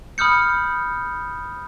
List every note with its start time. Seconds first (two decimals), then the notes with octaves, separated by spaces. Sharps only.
0.18 B5 D#6 F6 G6 C#7